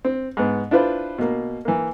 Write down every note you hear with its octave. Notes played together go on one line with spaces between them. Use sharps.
C4
G#2 B3
D4 E4 F4 B4 C5
B2 A#3
E3 A#3